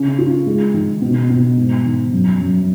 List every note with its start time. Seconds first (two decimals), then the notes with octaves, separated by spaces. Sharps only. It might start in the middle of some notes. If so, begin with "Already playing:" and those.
Already playing: C#3 C#4
0.18 F4
0.46 G#3
0.74 D#3
1.02 B2
1.30 B2
1.57 G#2
1.85 D#3
2.13 F#2
2.41 F#2